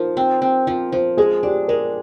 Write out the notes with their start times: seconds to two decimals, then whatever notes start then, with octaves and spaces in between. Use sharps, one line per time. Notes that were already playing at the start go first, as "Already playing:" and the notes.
Already playing: F3 D#4 A#4
0.17 C4
0.42 C4
0.67 F3 C5
0.92 F3 C5
1.17 G#3 G#4
1.43 D4 G4
1.68 G#3 A#4